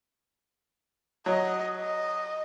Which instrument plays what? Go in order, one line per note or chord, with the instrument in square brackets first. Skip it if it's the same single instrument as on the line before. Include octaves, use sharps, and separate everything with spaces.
[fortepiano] F#3 [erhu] D#5
[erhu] D#5